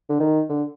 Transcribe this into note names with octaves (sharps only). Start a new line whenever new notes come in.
D3
D#3
D3